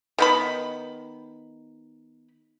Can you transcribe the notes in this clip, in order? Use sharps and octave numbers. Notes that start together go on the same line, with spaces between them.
D#3 B3 B5